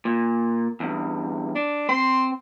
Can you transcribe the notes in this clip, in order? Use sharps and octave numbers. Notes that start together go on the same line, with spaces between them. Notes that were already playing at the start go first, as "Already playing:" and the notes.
A#2
E2 G2
D4
C4 C6